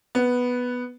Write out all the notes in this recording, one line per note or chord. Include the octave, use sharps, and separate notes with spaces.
B3